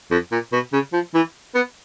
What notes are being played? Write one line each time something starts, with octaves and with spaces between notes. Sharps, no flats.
F2
A#2
B2
C#3
F3
E3
B3